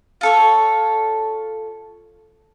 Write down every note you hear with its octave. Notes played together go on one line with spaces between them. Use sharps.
F4 A4 C#5